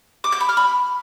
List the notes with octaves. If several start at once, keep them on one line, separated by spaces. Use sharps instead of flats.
D6
G6
B5
F6
B5